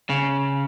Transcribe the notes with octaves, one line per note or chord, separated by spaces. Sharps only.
C#3